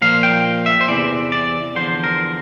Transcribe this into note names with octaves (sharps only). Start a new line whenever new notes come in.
A#2 F3 A#3 F5
G5
E5
C5
E2 C3 E3 D5
D5
E2 D3 F3 C5
A#4